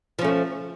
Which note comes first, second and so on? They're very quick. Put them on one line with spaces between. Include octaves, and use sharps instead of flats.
F3 C#4 A3